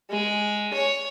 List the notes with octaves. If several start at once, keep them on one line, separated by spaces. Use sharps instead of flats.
G#3
C#5